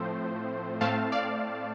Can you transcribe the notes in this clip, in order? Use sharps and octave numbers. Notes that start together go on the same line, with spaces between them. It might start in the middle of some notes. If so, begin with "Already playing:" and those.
Already playing: A2 F3 A3 C4 C5
A2 A3 C4 F5 A5
D5 F5